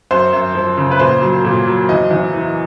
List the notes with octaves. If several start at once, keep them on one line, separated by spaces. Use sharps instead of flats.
F#2 C5
F#2
F3
C#3
B4
A#2 C5
F#3
A#2
F#3
E2 D#5
E2
E3